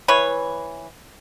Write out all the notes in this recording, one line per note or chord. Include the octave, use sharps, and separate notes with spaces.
E3 B4 C#5